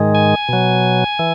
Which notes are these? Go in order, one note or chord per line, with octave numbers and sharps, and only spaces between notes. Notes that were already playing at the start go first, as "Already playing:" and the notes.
Already playing: G#2 D#3 G#3
G#5
B2 F#3
E3